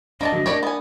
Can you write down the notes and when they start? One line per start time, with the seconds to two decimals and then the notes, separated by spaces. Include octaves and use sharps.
0.21 A#3 D4 D5 D#5 A5
0.32 D3 F#3 A3
0.46 A#3 C4 D4 G4 C#5 D5
0.63 B3 G#5